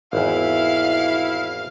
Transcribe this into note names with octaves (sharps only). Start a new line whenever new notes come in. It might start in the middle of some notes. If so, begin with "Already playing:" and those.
G#1 E2 E4 F5